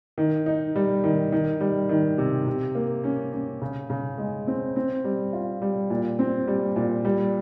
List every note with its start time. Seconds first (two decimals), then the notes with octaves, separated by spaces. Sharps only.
0.18 D#3
0.46 D#4
0.76 G3
1.04 D#3
1.32 D#3
1.60 G3
1.89 D#3
2.18 C3
2.47 C3
2.75 A#3
3.04 C#4
3.33 C#4
3.62 C#3
3.90 C#3
4.18 G#3
4.47 C4
4.76 C4
5.04 G3
5.33 F4
5.62 G3
5.90 A#2
6.19 C4
6.48 G3
6.76 A#2
7.05 G3